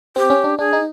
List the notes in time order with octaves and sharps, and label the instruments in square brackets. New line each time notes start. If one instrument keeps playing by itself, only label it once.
[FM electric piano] C4 [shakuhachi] G4
[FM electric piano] C#4
D4
[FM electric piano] D4 [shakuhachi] G#4
[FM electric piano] D#4